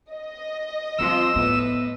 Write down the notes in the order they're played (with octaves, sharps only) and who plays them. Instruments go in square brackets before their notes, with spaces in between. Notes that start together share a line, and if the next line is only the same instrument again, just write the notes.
[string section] D#5
[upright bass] D3 C4 [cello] F3 F4 [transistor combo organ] E6
[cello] A2 B4 [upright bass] B3